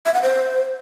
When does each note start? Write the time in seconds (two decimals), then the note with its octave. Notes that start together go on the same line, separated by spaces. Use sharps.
0.06 E5
0.14 F#5
0.22 C5